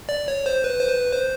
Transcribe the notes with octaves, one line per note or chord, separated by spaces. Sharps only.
D5
C#5
C5
B4
C5
B4
C5